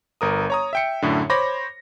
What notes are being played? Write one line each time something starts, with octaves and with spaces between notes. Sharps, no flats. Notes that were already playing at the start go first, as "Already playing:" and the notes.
G1 A#4 D#6
C#5 A#5 D#6
E5 G5 C#7
F#2 A2 D3
C5 C#5 B5 D6 A#6